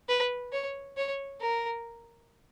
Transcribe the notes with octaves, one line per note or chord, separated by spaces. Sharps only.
B4
C#5
C#5
A#4